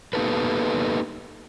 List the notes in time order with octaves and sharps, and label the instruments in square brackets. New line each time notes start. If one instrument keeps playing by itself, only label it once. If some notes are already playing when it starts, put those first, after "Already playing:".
[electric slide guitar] A#3 B3 D#4 G4 A4 B4